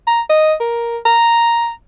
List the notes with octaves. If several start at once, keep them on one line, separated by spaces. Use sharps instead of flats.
A#5
D#5
A#4
A#5